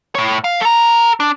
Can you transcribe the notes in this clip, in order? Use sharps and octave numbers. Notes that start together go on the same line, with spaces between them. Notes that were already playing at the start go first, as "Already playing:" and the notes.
A2 C#5
F5
A4 A#5
D4